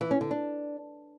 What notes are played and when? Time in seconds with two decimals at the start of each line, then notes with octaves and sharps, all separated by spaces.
0.01 E3
0.11 C#4
0.21 D3
0.31 D4